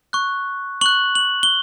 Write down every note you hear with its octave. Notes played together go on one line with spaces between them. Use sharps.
C#6 F#6
C#6 F#6 F#7
F#7
G7